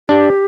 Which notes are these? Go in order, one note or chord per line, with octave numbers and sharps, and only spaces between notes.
D4 G4